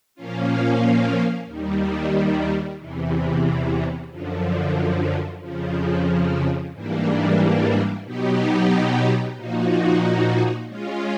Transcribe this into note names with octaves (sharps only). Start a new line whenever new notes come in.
A#2 F3 A#3 C#4 F4
D#2 D#3 G3
E2 C3 E3
F#2 D3 F3
F2 C#3 F3
G#2 E3 G3 A#3 D4
B2 F#3 B3 D#4 G4
A#2 F3 A#3 D#4 F#4
G#3 C#4 F4